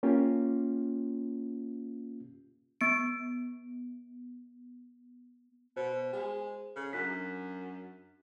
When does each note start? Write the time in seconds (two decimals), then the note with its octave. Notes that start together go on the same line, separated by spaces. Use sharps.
0.03 A#3 C#4 F4 G4
2.81 B3 D7
5.77 B2 C5
6.13 G#3
6.76 C#3 A4
6.93 F#2 D4 F#6 B6